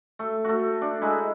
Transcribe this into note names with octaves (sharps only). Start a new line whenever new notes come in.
A3
A3 F#4
D4
G#3 D#4 E4